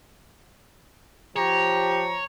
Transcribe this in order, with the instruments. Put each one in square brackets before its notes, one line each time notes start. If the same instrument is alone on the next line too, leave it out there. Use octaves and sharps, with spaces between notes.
[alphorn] F3 [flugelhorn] G4 [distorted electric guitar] C#5 [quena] A#5